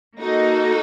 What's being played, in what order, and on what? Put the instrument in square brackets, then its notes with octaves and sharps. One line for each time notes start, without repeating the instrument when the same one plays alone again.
[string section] A#3 D#4 F#4 A4